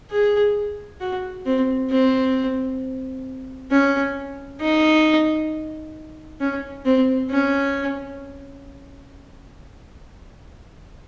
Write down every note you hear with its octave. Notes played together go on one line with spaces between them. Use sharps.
G#4
F#4
C4
C4
C#4
D#4
C#4
C4
C#4